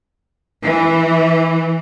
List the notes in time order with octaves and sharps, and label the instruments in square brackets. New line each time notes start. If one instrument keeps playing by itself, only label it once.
[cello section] E3